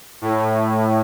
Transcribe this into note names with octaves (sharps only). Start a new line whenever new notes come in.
A2